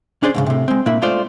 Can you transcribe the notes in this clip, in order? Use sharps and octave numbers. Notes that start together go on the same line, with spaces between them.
C#4 D4 G#4 C5 D5
C#2 G#2 C#3
A2 C3
G#3 C4
A#2 A#3 D4 E4
G#3 A3 F4 C5 D5